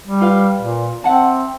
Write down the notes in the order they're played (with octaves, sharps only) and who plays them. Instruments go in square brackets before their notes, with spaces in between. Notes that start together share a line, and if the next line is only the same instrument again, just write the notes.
[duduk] G3
[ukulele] F4 B4 F5
[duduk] A#2
[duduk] C4 [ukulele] E5 F#5 A5